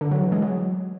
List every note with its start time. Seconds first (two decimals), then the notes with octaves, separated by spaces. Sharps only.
0.01 D3
0.11 F#3
0.22 E3
0.32 G#3
0.42 F#3